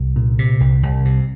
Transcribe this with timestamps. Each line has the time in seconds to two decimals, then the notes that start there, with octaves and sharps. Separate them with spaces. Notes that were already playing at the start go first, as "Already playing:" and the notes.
Already playing: C2
0.16 A#2
0.39 C3
0.60 C2
0.83 C2
1.05 C3